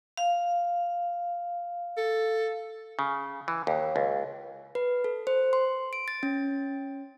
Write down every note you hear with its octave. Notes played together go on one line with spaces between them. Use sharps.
F5
A4
C#3
E3
D#2
C#2
B4
A4
C5
C6
D7
A6
C#4